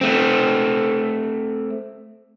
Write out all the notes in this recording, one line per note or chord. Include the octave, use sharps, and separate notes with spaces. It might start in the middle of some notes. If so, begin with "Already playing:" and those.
A3 C4